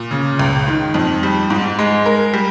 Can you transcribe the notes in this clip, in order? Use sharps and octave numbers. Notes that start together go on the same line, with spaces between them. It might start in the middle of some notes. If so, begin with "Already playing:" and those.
Already playing: A#2
C#3
C#2
D#3
F2
G3
G#2
G#3
A#4
G3